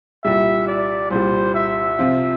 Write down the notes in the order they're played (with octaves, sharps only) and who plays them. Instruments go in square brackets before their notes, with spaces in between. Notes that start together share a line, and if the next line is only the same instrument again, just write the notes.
[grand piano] C2 A#2 G3 [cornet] E5
[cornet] D5
[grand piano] C2 A#2 G3 [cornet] C5
[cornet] E5
[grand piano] C3 F3 C4 F4